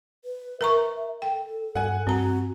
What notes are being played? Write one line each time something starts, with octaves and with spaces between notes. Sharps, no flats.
B4
A#4 E5 A#5 C#6
A4 G5
G2 F#5 G#5
G2 C4 F#4 A#5